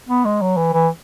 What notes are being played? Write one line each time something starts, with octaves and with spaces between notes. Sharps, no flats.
B3
G#3
F#3
E3
E3